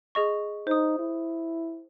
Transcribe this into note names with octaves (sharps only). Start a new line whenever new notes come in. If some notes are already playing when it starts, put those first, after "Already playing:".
G#4 D#5 C#6
D#4 C5 D#6
E4